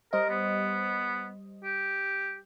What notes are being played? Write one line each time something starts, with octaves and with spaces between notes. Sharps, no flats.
G3 A#4 C5 D#5
B3
G4